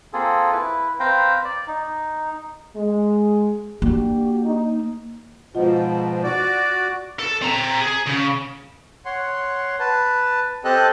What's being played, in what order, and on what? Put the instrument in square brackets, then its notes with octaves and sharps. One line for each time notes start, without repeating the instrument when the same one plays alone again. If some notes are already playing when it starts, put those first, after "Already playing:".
[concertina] A#3 C4 F4 G#4 A4
E4 B4
C4 B4 C5 F5 G5 A#5
D5
D#4
[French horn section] G#3
[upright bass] A#3 [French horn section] D4 F#4 G4
[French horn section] D#4
[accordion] G#2 B2 F3 [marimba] F4 D#5 F#5
[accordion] F#4 D5
[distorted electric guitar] A4
C4 A#5
G#4
C#3
[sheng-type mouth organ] C#5 F#5 C6
B4 A5
C4 G4 A4 D#5 A5 F#6